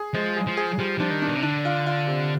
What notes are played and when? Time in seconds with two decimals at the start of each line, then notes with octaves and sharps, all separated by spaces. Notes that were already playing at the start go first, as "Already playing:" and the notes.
Already playing: G#4
0.14 F3 G#3
0.36 G#4
0.47 F3
0.57 G#4
0.78 F3 G3
0.99 F3 D4
1.10 D#3
1.22 D4
1.28 B2
1.36 C3
1.43 D3 D4
1.65 F4
1.86 F4
2.07 C3